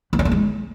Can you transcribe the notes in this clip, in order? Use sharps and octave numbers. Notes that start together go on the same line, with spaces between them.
B3
D4
A3
G#3